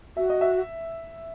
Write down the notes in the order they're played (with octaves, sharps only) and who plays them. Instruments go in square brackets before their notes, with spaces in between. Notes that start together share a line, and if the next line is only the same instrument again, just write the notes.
[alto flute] F#4 [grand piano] E5
[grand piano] D#5
E5